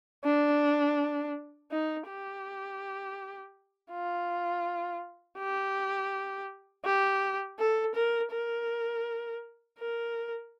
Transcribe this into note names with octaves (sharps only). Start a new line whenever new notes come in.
D4
D#4
G4
F4
G4
G4
A4
A#4
A#4
A#4